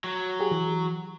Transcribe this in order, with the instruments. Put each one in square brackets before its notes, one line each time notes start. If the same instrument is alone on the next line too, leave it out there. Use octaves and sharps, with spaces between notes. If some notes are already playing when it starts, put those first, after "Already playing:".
[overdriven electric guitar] F#3
[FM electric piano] G4 G#4
E3